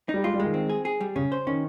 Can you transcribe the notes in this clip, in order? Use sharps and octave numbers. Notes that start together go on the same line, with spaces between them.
G3 D#4
G#3 F4
G3
D#3 G#3
C4
G#4
G#4
G3
C#3 C#4
C5
D#3 C#4